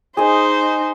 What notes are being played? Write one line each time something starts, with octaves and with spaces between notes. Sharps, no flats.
D#4 G#4 C5 D#5